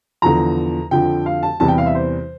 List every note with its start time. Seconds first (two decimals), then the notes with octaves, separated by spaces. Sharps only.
0.22 E2 D3 F3 A#5
0.91 F2 D3 F3 G5
1.26 F5
1.43 A5
1.60 E2 C3 E3 G3 A5
1.68 G5
1.78 F5
1.86 E5
1.95 C5